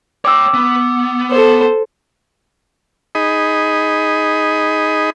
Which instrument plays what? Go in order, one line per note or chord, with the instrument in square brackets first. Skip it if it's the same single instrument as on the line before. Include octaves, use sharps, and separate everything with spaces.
[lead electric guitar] C#5 G5 [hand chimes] D6 E6
[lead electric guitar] B3
[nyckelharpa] A4 C5
[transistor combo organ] D#4 G#4 D#5 B5